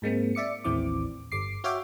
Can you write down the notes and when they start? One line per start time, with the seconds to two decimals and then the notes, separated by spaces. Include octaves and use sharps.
0.02 G#2 G#3 A#3 C4
0.35 D5 E5 D6 C#7
0.64 A1 D#2 E3 C4 E4 D6
1.32 G1 D6 C7
1.64 F#4 C#5 E5 F5 G5 D6